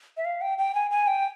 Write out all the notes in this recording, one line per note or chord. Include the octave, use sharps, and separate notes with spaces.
E5
F5
G5
G5
G#5
G#5
G5